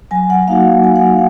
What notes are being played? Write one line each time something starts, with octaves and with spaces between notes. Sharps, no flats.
F#3 G#5
F#5
A#3 D#4 F#4 F5
F#3 G#5
F#5
F5